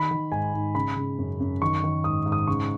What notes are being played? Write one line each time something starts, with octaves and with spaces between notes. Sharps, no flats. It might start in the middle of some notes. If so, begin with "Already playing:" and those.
Already playing: D#3 B5
D#3
G#2 G#5
G#2
C#3 B5
C#3
F#2
F#2
D#3 C#6
D#3
G#2 D#6
G#2
D#6
C#3 C#6